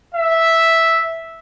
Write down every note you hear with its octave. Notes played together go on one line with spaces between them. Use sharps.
E5